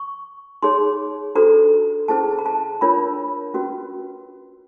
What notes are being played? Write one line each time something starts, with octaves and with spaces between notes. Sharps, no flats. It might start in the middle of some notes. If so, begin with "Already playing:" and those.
Already playing: C#6
D#4 G#4 C#5 C6
D4 F#4 A4 C5 A#5
C#4 E4 G#4 C5 A5
A#5
A5
D4 F4 A#4 C#5 B5
C#4 F#4 B4